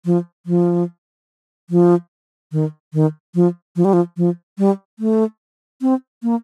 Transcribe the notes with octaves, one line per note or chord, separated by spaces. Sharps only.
F3
F3
F3
D#3
D#3
F3
F3
G3
F3
F3
G3
A3
C4
A#3